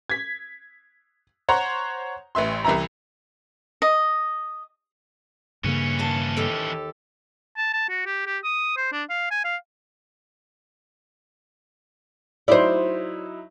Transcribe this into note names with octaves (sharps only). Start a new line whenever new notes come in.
G#6 B6
C5 C#5 F#5 A#5 C6
A1 B4 E5 C6
C2 E3 B4 E5 A#5
D#5
G2 C#3 E3 A#3 C#4
D#2 F5 A5
D#2 G4 A4
A5
A5
F#4
G4
G4
D#6
C5
D4
F5
G#5
F5
F#3 D#4 E4 C5 D5